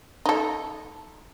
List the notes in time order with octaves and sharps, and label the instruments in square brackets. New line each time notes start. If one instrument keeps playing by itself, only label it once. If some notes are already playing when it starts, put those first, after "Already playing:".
[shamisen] D#4 A4